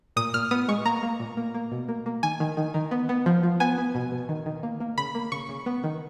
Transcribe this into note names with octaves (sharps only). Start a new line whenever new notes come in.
A#2 D#6
A#2 F6
B3 D#6
G#3 C#6
A#3 A#5
A#3
A#2
A#3
A#3
B2
A#3
A#3
D#3 G#5
D#3
D#3
D#3
B3
B3
F3
F3
B3 G#5
B3
B2
B2
D#3
D#3
A#3
A#3
C#3 B5
A#3
C#3 C#6
C#3
B3
D#3